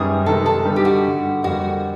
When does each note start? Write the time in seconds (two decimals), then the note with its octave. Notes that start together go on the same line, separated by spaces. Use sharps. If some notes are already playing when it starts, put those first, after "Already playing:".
Already playing: F#2 D#3 G3 B3 G#4
0.26 C3 D#3 G#3 B3 A4
0.46 A4
0.65 D3 G3 B3 D#4
0.76 G4
0.85 F#4
1.04 G2 D3 G3
1.44 F2 D3 G3 A#3 F#4